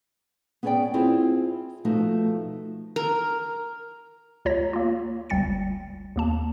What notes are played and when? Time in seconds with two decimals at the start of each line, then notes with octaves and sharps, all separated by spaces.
0.63 B3 C#4 G#4 C#5 D5 G5
0.94 C4 E4 F4 G#4 C5
1.85 B2 F3 A3 D#4 F#4
2.96 A#4
4.45 D2 F4 C#5 A#5 A#6
4.73 A#3 F4
5.30 G1 D2 G3 G5 A6 C#7
6.16 D#2 A#3 A5